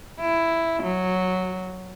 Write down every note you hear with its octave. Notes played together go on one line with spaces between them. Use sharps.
E4
F#3